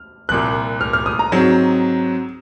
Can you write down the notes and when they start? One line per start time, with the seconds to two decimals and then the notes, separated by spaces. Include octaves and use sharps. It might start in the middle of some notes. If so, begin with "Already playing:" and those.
Already playing: F6
0.29 C2 A#2 F3 F#6
0.81 F6
0.93 F6
1.06 D#6
1.19 A#5
1.32 G#2 F#3 C4